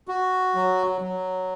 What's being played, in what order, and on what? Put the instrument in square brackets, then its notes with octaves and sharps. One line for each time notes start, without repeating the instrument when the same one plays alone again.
[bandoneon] F#4
F#3
F#3